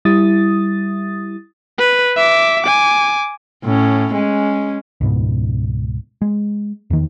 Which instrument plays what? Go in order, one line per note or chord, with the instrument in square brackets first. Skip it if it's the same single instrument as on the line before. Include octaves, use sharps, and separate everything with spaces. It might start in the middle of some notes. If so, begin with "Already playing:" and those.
[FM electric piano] G3 E4 D#6 A6
[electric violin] B4
E5 D6
G#5 D6
[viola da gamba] A2 C#4
G#3 C#4
[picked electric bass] C#2 G#2 B2
G#3
E2 D#3